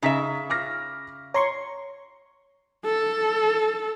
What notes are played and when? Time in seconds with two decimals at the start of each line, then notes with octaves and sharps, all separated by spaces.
0.03 C#3 D#4 E5 A#5 B6
0.50 D6 F6 A#6
1.34 C#5 A#5 C6 C#6
2.85 A4